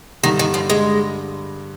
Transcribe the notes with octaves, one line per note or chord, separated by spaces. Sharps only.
G2 D3 D#3 G3
D#3
F3
G#3